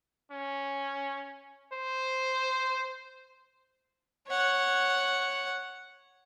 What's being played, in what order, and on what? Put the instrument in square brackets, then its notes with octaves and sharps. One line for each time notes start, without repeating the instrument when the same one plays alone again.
[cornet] C#4
C5
[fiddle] C#5 F#5